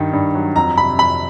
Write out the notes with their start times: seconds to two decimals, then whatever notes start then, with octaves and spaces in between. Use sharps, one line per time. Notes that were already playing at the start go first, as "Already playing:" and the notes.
Already playing: G2 D#3
0.13 G2
0.35 F#3
0.56 F2 A#5
0.78 C3 B5
0.98 F2 B5